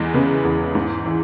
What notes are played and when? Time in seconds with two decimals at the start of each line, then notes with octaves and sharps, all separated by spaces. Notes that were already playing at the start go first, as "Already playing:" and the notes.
Already playing: E2 E3 G#3
0.14 C#3 B3
0.45 E2
0.75 G#2
1.06 E3